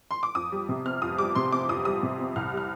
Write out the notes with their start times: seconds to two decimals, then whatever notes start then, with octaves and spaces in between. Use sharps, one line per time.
0.11 C6
0.23 D6
0.35 F2 D#6
0.52 G3
0.69 C3
0.86 C4 F6
1.02 F2 D#6
1.18 G3 D6
1.35 C3 C6
1.52 C4 D6
1.69 F2 D#6
1.85 G3 D#6
2.03 C3
2.19 C4
2.36 C2 F6
2.53 G3 F6